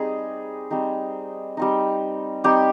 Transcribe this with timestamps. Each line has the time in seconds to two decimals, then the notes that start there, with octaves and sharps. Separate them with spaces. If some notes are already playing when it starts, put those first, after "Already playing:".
Already playing: G3 C4 D#4 G#4
0.70 G3 C4 D#4
1.57 G3 C4 D#4
2.44 G3 C4 D#4 G4